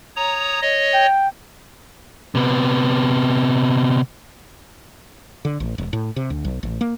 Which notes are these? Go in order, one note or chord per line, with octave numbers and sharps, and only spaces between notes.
C#5 A#5 D#6
C#5 D#5
G5
C3 B3
D3
A1
E1
A2
C3
D2
B1
A1
A#3